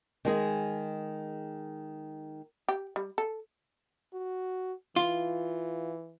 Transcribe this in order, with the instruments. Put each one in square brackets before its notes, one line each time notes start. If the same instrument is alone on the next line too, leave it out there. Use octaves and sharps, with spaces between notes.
[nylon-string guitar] D#3 G#3 G#4
[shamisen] G4
G3
A4
[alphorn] F#4
[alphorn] E3 [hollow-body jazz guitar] F4